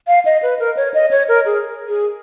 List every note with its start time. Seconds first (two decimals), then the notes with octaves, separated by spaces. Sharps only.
0.07 F5
0.25 D#5
0.43 B4
0.59 A#4
0.77 C#5
0.94 D#5
1.11 C#5
1.28 A#4
1.46 G#4
1.88 G#4